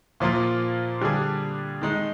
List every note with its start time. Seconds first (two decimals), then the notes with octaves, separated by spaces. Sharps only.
0.20 A#2 F3 A#3 F4
1.01 D3 G3 D4 G#4
1.81 D#3 G#3 D#4